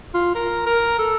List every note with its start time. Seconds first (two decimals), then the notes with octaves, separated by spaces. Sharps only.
0.14 F4
0.35 A#4
0.66 A#4
0.99 A4